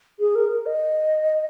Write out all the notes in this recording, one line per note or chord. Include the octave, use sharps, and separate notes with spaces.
G#4
A#4
A#4
D#5